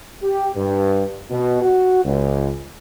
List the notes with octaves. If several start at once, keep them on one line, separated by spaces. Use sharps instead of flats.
G4
G2
B2
F#4
C#2